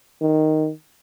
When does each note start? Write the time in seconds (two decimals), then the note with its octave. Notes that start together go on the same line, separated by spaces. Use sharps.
0.22 D#3